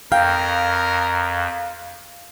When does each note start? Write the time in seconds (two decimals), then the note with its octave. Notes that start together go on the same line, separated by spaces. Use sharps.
0.12 F2 A#4 F5 G5